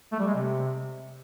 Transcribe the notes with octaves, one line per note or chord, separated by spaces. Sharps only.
A3
G3
G#3
C3